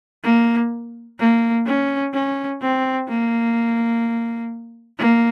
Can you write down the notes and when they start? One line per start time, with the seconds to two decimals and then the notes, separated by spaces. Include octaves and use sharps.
0.24 A#3
1.19 A#3
1.66 C#4
2.13 C#4
2.61 C4
3.08 A#3
4.98 A#3